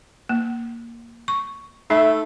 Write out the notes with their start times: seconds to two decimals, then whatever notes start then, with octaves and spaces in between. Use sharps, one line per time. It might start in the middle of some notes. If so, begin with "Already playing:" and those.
0.29 A#3
1.28 C#6
1.90 A3 D#4 E5